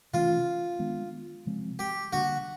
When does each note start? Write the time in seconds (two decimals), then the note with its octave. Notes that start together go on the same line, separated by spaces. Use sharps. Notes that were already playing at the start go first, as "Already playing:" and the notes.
0.13 C3 E3 A3 C#4 F4
0.79 D#3 G#3 B3 D4
1.46 C3 F3 G#3 C4
1.79 G4
2.13 D3 G3 A#3 D4 F#4